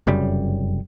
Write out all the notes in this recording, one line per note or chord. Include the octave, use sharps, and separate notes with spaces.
F1 F#2 C#3 G3